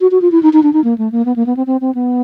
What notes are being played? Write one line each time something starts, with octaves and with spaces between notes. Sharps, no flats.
F#4
F#4
F4
E4
D#4
D#4
D4
D#4
A#3
A3
A#3
B3
A#3
B3
C4
C4
C4
B3